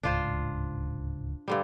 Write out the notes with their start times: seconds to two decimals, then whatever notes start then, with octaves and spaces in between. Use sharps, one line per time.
0.03 D1 C#2 G#2 D4 F4 C5
1.48 G2 D3 G3